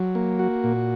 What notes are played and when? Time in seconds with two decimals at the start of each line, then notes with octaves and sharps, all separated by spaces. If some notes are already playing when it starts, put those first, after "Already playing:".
Already playing: F#3
0.15 A#3
0.39 F#4
0.64 A#2